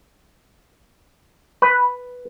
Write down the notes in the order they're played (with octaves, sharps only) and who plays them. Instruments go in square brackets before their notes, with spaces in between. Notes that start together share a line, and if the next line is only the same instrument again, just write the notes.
[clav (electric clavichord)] B4